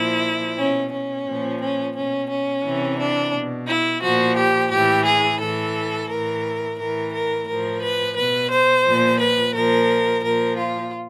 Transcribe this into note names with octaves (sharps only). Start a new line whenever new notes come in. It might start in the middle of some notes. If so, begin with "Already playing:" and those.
Already playing: A#2 F3 E4
B2 C#4
C#4
A#2 F3
C#4
B2 C#4
C#4
C3 E3
D4
B2
E4
A#2 F3 F#4
G4
A2 E3 G4
G#4
A2 E3 A4
A2 E3 A#4
A2 E3 A#4
A#4
A2 F3 A#4
B4
B2 B4
C5
A#2 F3
B4
A#2 F3 A#4
A#2 F3 A#4
F4